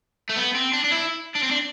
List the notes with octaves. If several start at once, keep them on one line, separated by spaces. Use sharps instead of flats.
A3
B3
C4
D4
D4
E4
D4
C4
D4